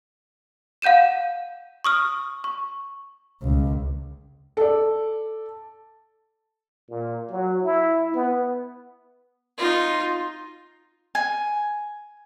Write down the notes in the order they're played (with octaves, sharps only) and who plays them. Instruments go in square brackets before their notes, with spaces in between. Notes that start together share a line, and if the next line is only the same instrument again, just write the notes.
[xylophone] F5 F#5 G6 D#7 E7
C#6 D#6 F6
C#6
[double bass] C#2
[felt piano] A4 D5
[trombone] A#2
F#3
E4
B3
[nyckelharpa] D#4 F4
[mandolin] G#5